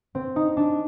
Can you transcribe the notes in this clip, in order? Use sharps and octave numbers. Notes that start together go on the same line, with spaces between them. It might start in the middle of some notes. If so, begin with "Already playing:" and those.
C4
D#4
D4